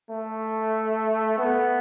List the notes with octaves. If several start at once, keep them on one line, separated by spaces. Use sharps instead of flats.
A3
B3